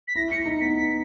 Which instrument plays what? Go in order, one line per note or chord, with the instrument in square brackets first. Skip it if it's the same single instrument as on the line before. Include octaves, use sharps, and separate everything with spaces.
[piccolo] B6
[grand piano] E4 [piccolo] A#6
[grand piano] E4 [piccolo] C#7
[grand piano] D#4
[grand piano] B3 [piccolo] B6
[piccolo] B6